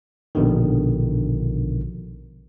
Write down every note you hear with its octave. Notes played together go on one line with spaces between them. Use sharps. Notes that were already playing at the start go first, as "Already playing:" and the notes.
A#1 B2 D3 D#3